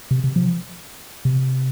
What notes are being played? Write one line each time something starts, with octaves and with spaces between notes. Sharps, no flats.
C3
C3
F3
C3